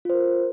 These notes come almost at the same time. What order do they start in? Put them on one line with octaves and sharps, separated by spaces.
F4 C5 A#4